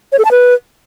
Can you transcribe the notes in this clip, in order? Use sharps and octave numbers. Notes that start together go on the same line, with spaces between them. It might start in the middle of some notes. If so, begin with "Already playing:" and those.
C#5
A4
A5
B4